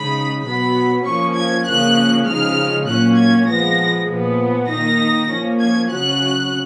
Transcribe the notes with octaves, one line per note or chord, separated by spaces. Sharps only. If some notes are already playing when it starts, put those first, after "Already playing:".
Already playing: C#3 G#3 D#4 B5
B2 F#3 B3 B5
F3 A#3 C#4 C#6
G#6
C#3 F3 A#3 C#4 F#6
C#3 F3 G#3 D#4 F6
A#2 F#3 A#3 C#4 F#6
G#6
F3 G#3 B3 A#6
A#2 F3 B3
D#3 A#3 D#4 A#6
F3 A#3 C#4
G#6
C#3 F#3 C#4 F#6